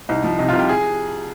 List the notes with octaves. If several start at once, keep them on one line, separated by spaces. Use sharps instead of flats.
C2 D#4
F3
C3 D#4
F4
C2
G4
G#4